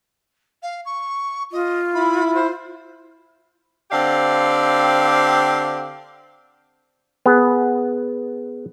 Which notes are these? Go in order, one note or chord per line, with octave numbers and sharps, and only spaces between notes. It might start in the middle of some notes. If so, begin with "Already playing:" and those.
F5
C#6
F4 D#5
E4 B5
C5
D3 C4 G4 D5 F5
B3 G#4